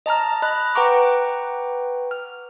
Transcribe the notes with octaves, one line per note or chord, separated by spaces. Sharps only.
D#5 A5 A#5 F6
D#5 B5 F6 F#6
B4 F#5 G5 A#5 C#6 D6
F6